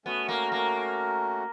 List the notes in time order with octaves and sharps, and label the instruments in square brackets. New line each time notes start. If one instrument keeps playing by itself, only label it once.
[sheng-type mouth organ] A3 C#4 F#4 [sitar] B3
[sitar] A#3
A#3